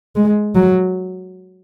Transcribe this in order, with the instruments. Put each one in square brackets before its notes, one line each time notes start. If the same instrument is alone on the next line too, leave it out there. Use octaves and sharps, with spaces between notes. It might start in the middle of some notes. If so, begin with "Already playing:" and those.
[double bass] G#3
F#3